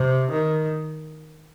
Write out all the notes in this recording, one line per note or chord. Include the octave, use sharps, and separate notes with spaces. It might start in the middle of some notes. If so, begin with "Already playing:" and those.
Already playing: C3
D#3